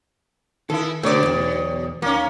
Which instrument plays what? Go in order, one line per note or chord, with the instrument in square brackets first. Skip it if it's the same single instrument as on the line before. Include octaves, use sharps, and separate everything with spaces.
[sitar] D#3 E4 [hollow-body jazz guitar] A4
[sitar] B2 C#5 D5 [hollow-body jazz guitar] D3 A3
[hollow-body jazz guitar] B1 E2
[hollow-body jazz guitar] D#2 [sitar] A#3 C#4